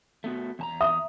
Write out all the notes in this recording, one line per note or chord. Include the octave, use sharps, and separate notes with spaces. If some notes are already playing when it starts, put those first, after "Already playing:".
A3 B3 F#4
E2 A5 A#5
E5 D#6